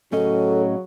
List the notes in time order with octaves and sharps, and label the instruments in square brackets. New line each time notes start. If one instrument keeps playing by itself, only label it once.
[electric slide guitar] A2 C#4 D#5 [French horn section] C#3 F#3 [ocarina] A4